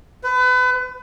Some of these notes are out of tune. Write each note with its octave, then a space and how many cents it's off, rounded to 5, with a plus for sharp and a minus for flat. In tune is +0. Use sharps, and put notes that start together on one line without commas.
B4 +30